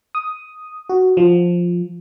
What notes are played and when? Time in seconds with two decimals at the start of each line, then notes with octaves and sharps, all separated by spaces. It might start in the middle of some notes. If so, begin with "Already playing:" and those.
0.15 D#6
0.89 F#4
1.17 F3